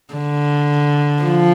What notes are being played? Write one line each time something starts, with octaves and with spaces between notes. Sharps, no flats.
D3
F3